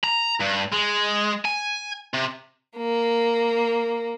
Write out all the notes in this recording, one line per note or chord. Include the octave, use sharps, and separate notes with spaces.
A#5
G2
G#3
G#5
C3
A#3